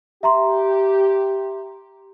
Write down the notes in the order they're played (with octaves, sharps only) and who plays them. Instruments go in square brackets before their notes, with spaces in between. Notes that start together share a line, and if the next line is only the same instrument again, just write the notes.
[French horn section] G4 [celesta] E5 A#5 C6